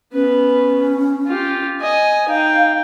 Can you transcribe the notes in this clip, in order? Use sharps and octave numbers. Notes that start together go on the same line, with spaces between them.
B3 C#4 B4
F4 G4
D#5 G#5
D#4 F5 G5